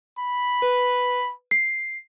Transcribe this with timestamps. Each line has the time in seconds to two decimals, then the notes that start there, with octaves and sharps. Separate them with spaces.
0.19 B5
0.62 B4
1.51 C7